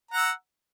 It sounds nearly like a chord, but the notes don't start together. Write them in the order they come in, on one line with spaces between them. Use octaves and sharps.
A#5 F#5 E6